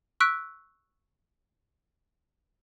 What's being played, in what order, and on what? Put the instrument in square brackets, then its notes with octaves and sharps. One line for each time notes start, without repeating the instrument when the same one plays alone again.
[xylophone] C#6 E6 F#6 B6 D7